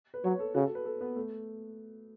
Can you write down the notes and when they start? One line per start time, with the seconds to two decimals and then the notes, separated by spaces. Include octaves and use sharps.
0.14 B4
0.24 F#3 C#5
0.39 A4
0.54 C#3 F#4
0.65 A4
0.75 B4
0.85 A4
1.01 B3
1.16 A3